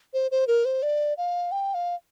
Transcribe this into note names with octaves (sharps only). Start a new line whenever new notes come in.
C5
C5
A#4
C5
D5
F5
G5
F5